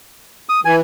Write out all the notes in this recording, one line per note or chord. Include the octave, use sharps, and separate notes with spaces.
D#6
E3 G#5